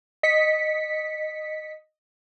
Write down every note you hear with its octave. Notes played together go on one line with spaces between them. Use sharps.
D#5 B6 C#7